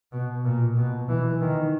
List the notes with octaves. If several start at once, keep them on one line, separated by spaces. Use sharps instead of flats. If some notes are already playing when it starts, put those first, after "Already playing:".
B2
A#2
B2
E3
D#3